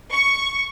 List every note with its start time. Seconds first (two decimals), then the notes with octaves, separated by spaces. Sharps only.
0.13 C#6